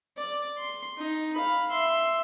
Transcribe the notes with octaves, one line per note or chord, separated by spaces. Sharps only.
D5
C6
D#4
F5 B5
E5 C6